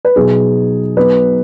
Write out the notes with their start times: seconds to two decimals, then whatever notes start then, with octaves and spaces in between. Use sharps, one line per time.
0.05 B4
0.16 B2 F#3 D#4 G#4
0.97 F#3 B3 D#4 B4